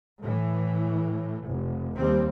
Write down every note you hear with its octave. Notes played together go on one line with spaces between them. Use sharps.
A2 E3
F1
D#2 G3 C4